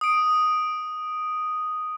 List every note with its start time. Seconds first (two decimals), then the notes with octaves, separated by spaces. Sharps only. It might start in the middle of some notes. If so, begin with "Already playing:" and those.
0.01 D#6 D7